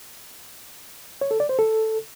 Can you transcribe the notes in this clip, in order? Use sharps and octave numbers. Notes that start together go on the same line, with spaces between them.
C#5
A4
D5
C5
A4